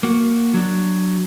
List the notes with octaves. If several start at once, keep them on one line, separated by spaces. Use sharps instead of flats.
A#3 F#4
F#3 D4